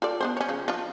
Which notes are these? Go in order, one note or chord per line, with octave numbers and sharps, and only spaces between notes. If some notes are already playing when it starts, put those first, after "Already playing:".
F4 A4 D5
B3 D4 C5
C#4 C#5
C#3 F3
F3 D4 F4